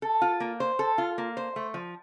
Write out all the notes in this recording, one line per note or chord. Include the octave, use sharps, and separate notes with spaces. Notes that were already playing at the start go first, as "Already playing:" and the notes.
A4
F4
A#3
C5
A4
F4
A#3
C5
A3
F3